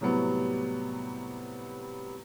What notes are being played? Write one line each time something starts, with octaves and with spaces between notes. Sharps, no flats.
A2 C3 F#3 G3 B3